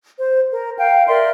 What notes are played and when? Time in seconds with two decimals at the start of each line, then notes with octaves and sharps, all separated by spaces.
0.19 C5
0.51 A#4
0.79 F5 G5
1.07 A#4 D5 E5 C6